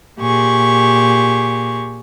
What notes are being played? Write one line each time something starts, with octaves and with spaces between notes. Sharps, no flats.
A#2 G4 G#4 C#6